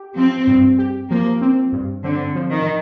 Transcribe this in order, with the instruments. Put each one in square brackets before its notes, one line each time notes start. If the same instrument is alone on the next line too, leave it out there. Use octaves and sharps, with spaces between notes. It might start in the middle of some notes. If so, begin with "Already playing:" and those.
Already playing: [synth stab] G4
[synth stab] F3 [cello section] C4
[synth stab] G2
G4
[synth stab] F3 [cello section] A#3
[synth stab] C4
G2
[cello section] D3 [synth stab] C4
[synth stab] F3
[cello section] D#3